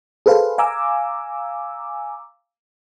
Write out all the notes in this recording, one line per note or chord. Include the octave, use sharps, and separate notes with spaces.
G#4 A4 B4 C5 F5
F5 G#5 A#5 D6 E6